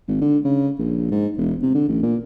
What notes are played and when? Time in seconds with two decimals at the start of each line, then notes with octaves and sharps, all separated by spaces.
0.09 G#1
0.21 D3
0.44 C#3
0.79 A#1
1.11 G#2
1.38 E1
1.62 C3
1.75 D3
1.88 A1
2.03 A#2